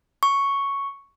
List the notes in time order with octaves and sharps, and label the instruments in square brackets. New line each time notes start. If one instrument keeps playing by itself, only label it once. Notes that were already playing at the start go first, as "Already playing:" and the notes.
[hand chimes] C#6